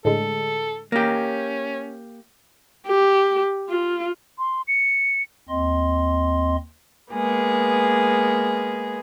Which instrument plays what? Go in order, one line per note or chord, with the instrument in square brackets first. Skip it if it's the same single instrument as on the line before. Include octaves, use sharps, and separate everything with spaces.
[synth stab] A2 D3 G#3 [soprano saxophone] A4
[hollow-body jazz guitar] A#3 G4 [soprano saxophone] C#4
[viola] G4
F4
[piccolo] C6
C#7
[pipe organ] D#2 C4 D#5 C6
[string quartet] G#3 A#3 B3 G#4